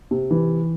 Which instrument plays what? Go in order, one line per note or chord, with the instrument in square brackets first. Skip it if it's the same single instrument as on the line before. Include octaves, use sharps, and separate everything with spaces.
[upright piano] C3
E3